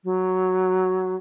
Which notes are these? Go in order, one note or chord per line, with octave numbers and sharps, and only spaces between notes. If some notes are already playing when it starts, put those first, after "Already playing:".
F#3